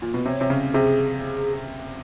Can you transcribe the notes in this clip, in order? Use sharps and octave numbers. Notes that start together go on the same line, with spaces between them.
A#2
B2
C3 C#5
C3
C#3
C3 G#4